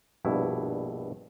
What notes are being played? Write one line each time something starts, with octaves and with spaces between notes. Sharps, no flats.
A#1 G2 B2 E4